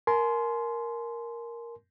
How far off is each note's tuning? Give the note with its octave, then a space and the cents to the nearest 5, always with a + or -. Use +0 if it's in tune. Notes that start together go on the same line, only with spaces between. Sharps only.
A#4 +0 G#5 +40 C6 -10